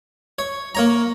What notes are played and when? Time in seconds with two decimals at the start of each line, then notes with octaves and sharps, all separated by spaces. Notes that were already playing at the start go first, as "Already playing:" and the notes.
0.39 C#5
0.75 A#3 C#5 A#5